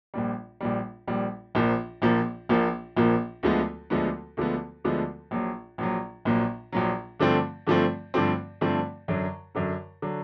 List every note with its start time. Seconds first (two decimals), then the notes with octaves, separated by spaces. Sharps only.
0.14 A#1 A#2 G3
0.61 A#1 A#2 G3
1.07 A#1 A#2 G3
1.55 A#1 A#2 F3 A#3
2.02 A#1 A#2 F3 A#3
2.49 A#1 A#2 F3 A#3
2.96 A#1 A#2 F3 A#3
3.43 D2 D3 F3 G#3 B3
3.90 D2 D3 F3 G#3 B3
4.37 D2 D3 F3 G#3 B3
4.84 D2 D3 F3 G#3 B3
5.31 A#1 A#2 F#3
5.78 A#1 A#2 F#3
6.25 A#1 A#2 F#3
6.72 A#1 A#2 F#3
7.20 G2 D3 F3 A3 C4
7.67 G2 D3 F3 A3 C4
8.14 G2 D3 F3 A3 C4
8.61 G2 D3 F3 A3 C4
9.08 F#2 D3 F#3
9.55 F#2 D3 F#3
10.02 D3 F#3